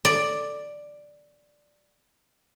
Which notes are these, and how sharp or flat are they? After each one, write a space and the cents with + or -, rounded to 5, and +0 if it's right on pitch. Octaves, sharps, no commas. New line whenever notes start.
D5 +5